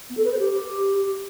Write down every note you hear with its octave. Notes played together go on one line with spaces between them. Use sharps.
B3
A4
B4
C5
G4